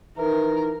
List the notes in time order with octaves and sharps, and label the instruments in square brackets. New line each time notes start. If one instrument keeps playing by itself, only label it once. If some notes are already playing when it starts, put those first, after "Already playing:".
[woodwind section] E3 D#4 [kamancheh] A#4